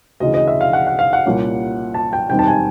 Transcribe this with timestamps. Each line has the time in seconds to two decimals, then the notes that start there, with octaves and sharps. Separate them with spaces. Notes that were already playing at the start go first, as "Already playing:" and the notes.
0.20 D2 C#3 E3 D#5
0.34 D#5
0.47 E5
0.61 F5
0.73 F#5
0.87 F#5
0.99 F5
1.13 F#5
1.26 C2 A#2 G3 A#3 C#4
1.94 A5
2.13 G5
2.29 E1 D#2 D#3 G3 C4 G5
2.39 A5
2.47 G#5